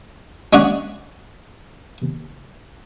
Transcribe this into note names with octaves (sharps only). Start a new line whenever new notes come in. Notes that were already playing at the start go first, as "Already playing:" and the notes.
C#4 D4 C#5 D5 F#5